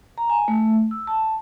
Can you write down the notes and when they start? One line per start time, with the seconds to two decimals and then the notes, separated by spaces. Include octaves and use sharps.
0.18 A#5
0.30 G#5
0.48 A3
0.91 E6
1.07 A5